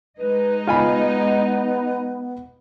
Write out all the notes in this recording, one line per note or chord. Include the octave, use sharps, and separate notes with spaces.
G#3 D#4 B4 D#5
B3 F4 G#5 B5